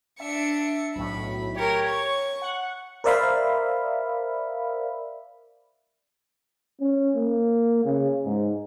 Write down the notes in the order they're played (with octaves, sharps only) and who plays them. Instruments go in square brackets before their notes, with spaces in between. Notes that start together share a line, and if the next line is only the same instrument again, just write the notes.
[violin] D4 C#7 [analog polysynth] E5
[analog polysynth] B1 A2 [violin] B5
[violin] G4 A#4 [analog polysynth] C#5
[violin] C#6
[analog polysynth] F#5
[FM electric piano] A#4 C5 D5 E5 F5 B5
[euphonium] C#4
A#3
C#3
G#2